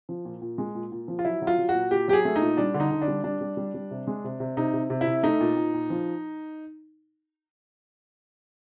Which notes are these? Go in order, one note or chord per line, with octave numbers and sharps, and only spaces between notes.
F3
A#2
A#2
G#3
A#2
A#2
F3
F4
F#3 E4
F#3
F4
F#3
F#4
A#2
A#2 G4
F#3 G4
G#4
A3
D#4
A#2
G3 D4
D3
D#4
D3
D4
G3
G3 D4
G3
G3
G3
C3
G#3
C3
C3
C3 D#4
C3
C3
E4
C3
A3 D#4
A#2
A#2
A#2
F3